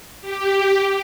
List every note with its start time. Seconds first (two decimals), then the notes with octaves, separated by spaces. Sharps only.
0.21 G4